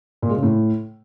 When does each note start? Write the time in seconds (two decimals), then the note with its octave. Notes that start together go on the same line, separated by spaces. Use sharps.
0.22 A#2
0.29 G#3
0.36 C#3
0.43 A2